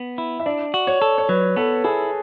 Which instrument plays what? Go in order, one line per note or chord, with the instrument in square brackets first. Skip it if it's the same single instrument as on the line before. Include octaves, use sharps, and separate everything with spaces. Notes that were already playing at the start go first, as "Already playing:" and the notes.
Already playing: [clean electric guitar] B3
E4
[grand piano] E5
[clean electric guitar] D4 [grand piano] D5
[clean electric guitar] F#4
[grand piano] C#5
[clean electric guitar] A4
[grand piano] C#5
[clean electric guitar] F#3 [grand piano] B4
[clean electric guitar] B3 [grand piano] A4
[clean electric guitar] E4 [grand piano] G#4